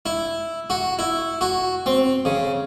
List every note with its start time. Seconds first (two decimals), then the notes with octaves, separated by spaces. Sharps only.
0.06 E4
0.70 F#4
0.99 E4
1.41 F#4
1.86 C4
2.25 C#3